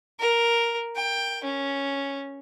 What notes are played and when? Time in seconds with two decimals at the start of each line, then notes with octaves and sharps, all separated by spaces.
0.19 A#4
0.95 G5
1.44 C#4